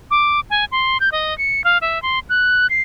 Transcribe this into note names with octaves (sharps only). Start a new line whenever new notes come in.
D6
G#5
C6
G6
D#5
C#7
F5
E5
C6
F#6
C7